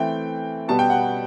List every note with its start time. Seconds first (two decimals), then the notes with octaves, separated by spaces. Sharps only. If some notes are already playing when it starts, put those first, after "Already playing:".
Already playing: E3 A3 C4 G5
0.68 B2 G3 B3 A5
0.79 G5
0.90 F#5